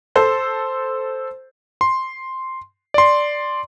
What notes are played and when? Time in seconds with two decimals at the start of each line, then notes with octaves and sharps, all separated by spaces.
0.16 A4 C5
1.81 C6
2.94 D5 C6